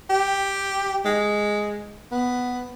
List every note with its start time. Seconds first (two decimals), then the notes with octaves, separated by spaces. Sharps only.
0.10 G4
1.05 G#3
2.12 B3